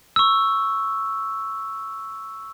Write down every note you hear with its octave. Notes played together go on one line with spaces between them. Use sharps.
C#6 E6